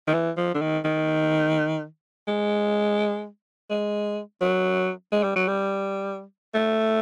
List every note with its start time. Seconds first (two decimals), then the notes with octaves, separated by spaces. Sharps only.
0.07 D#3
0.13 E3
0.37 F3
0.54 D3
0.61 D#3
0.84 D#3
2.28 G#3
3.70 G#3
4.41 F#3
5.12 G#3
5.23 G3
5.35 F#3
5.48 G3
6.54 A3